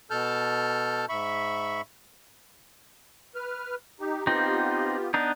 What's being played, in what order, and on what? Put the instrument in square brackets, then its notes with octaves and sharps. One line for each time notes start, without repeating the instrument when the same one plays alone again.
[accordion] B2 A4 A5 F6 G6
G#2 E5 B5 C#6
B4 F6
D#4 G4
[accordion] B3 F4 G4 [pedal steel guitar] C4 D#4
[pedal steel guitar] B3 D4 D#4 [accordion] D5